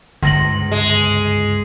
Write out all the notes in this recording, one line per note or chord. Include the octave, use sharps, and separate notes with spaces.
G1 C#2 G#2 D3 A#6 F#7
G#3